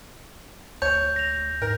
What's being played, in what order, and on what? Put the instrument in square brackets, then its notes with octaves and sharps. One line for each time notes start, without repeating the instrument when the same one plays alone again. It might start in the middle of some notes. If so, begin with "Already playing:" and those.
[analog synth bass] D2 [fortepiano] C#5 [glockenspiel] G6
[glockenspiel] A#6 F7
[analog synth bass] G#2 [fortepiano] A#4